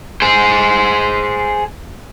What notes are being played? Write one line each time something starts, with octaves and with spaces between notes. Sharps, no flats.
G#4 C5